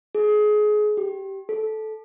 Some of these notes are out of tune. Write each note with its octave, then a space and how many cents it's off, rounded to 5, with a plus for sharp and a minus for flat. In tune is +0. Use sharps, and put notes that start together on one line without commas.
G#4 +25
G4 -15
A4 -15